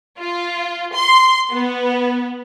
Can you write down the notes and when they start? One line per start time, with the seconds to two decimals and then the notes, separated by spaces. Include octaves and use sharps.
0.19 F4
0.94 C6
1.51 B3